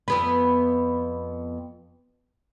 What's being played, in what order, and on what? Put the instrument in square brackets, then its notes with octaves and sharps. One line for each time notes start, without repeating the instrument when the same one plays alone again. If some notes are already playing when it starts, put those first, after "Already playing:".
[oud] F2 B3 B4